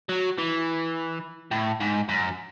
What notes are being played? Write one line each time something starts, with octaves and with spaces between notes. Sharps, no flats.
F#3
E3
A2
G#2
F#2